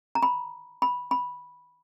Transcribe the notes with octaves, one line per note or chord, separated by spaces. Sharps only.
A#5
B5
B5
B5